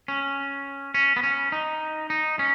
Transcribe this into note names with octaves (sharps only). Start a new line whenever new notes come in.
C#4
C#4
B3
C#4
D#4
D#4
C#4